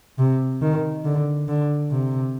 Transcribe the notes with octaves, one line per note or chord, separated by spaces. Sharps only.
C3
D#3
D3
D3
C3